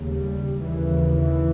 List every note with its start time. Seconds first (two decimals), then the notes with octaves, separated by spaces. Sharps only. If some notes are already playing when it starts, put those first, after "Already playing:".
Already playing: D#2 C#3
0.09 G3
0.63 D#2 C#3 E3
1.17 E3